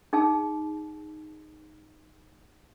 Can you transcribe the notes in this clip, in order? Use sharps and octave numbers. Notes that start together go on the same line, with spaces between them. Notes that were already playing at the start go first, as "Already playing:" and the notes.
D#4 G#4 G5 A5